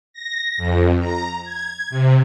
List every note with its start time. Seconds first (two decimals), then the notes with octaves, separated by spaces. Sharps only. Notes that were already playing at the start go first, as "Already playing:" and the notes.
0.13 A#6
0.57 F2
0.99 A#5
1.44 G#6
1.90 C3